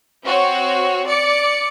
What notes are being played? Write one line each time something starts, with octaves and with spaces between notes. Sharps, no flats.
C4 F#4 C#5
D5 C#7